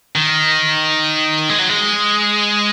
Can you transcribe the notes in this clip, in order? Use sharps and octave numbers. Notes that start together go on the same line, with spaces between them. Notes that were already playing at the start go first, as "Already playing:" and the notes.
D#3
G#3
F#3
G#3